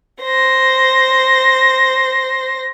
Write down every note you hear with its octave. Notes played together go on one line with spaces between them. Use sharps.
C5 A#6